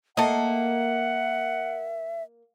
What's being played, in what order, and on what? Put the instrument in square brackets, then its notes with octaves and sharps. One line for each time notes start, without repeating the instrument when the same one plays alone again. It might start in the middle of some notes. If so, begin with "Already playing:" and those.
[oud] A#3 [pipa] A4 D#5 [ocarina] E5 [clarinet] F#5